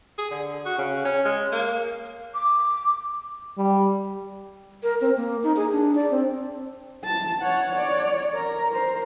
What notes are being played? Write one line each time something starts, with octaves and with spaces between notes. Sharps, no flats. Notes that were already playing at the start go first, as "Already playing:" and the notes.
G#4
D3
F#4
C#3
C#4
G#3
A#3
D6
G3
A#4
C4
A#3
D#4
G#4
D4
D5
C4
A5
C#5 F#5
C#5 D5
A#4
A#4 C5